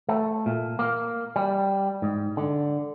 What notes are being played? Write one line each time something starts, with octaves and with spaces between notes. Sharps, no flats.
A3
A#2
A#3
G3
G#2
D3